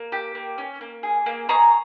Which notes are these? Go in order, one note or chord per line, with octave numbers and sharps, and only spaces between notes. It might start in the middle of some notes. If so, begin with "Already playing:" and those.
Already playing: A#3
G4
A#3
C#4
A#3
G#4
A#3
G#4 A#5 C#6